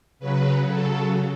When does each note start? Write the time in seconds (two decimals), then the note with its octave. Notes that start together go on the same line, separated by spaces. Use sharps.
0.19 C#3 F#3 B4
0.67 C#3 F#3 A4